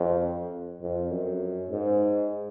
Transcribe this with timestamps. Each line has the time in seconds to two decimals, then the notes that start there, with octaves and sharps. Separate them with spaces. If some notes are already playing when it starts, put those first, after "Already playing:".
Already playing: F2
0.82 F2
1.11 F#2
1.70 G#2